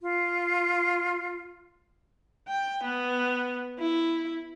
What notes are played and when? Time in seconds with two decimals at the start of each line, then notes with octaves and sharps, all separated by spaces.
0.01 F4
2.49 G5
2.84 B3
3.79 E4